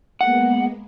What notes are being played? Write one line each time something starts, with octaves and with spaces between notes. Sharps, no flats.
G#3 A#3 B3 F#5